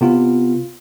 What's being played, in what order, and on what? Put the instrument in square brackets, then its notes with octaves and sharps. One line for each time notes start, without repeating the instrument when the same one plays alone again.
[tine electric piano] C3 B3 F4